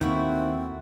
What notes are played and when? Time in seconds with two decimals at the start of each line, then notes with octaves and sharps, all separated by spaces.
0.01 D#2 D#3 A3 A#3 C4 E4 F#4